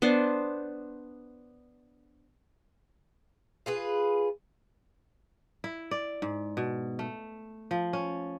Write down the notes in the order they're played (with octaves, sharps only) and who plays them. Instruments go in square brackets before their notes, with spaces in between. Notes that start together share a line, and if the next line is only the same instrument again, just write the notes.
[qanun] B3 D4 C5
[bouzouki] F4 G#4 B4
[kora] E4
D5
G#2
B2
A3
F3
C#4